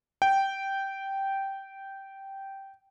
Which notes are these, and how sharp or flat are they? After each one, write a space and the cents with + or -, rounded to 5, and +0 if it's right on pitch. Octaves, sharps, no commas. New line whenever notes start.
G5 -10